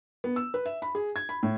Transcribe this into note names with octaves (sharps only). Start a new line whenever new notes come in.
B3
E6
B4
E5
B5
G#4
G#6
B5
A2